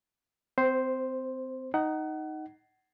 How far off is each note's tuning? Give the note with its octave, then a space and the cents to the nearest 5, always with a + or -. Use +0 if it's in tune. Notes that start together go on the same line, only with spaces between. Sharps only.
C4 -25 C5 +0
D#4 +0 F#5 +25